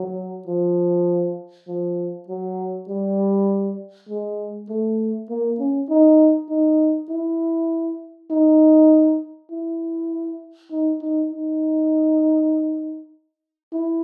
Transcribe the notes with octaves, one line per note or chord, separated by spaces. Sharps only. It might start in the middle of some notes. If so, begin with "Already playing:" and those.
Already playing: F#3
F3
F3
F#3
G3
G#3
A3
A#3
C#4
D#4
D#4
E4
D#4
E4
D#4
D#4
D#4
E4